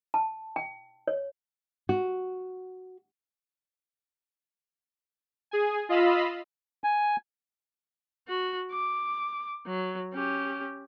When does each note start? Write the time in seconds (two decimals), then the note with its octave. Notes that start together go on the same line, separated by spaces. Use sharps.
0.14 A5
0.56 G5
1.08 C#5
1.89 F#4
5.51 G#4 G#5
5.89 F4 D#5 F5 B5 E6
6.84 G#5
8.28 F#4
8.71 D6
9.66 F#3
10.13 C#4 G4